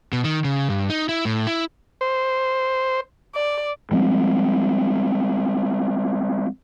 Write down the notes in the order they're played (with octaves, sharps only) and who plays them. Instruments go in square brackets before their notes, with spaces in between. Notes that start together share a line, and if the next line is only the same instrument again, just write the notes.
[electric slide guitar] B2
D#3
C#3
G2
D#4
E4
A2
E4
[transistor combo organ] C5
[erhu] D5
[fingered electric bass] F3 G3 G#3 C4